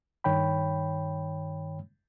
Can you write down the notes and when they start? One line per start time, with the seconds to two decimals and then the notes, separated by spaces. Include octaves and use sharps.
0.24 G2 D#3 C#5 G5 B5